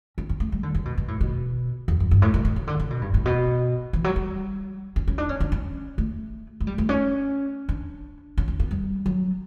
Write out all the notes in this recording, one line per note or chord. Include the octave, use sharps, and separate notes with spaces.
C#4
C#4
A3
G3
D3
C#3
B2
B2
A2
B2
E2
F#2
G2
A2
B2
B2
C#3
D3
C#3
B2
G2
A2
B2
E3
F#3
G3
C#4
C#4
D4
C#4
C#4
C#4
A3
A3
G3
A3
C#4
D4
C#4
C#4
B3
G3
F#3